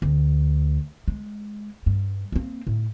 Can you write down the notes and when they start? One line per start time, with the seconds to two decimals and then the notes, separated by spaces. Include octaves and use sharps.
0.02 D2
1.08 G#3
1.86 G2
2.32 A#3 C4
2.67 A2